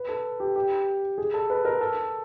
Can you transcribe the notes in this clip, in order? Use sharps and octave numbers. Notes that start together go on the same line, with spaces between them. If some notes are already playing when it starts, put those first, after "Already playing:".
Already playing: B4
A4
G4
G4
G#4
A4
B4
A#4
A4